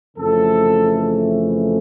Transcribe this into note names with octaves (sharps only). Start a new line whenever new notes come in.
F2 C#3 E3 A3 A4